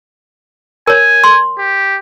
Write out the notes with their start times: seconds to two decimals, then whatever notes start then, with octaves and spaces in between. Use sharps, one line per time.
0.87 A#4 C#5 G#5
1.24 C6
1.58 G4